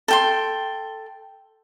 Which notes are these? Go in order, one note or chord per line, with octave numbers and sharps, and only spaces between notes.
A4 G5 C6